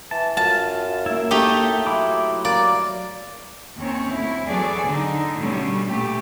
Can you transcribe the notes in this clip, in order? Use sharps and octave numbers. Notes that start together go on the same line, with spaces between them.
E3 A5
F#2 F4 A5
A#3 E4
A3 D#4 G4
F#3 E4 C6 D6
A#3 D5
D#2 C4 C#4 C#5
D2 E4
E2 F#3 B3 G#4 A4 D5
D3 D#4
B2 D3 G3 A3 C#4
A#2 A3 G4